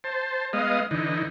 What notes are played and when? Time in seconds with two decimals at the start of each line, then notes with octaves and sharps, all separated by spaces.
0.04 C5 A5
0.53 G#3 B3 D#5 F5
0.91 D3 E3 D#4